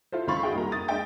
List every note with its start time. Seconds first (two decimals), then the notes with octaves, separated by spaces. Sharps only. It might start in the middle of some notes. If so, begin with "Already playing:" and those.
0.12 E4 F4 A4 C5
0.27 C#2 D#3 F5 B5 C#6 A6
0.43 D#4 F#4 G#4 E5 G5
0.55 C2 A#3 A#5
0.72 D#6 A6
0.88 G#3 D4 D#5 E5 G5 A6